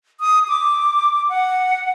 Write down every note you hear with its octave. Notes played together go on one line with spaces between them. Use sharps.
D#6
D6
F#5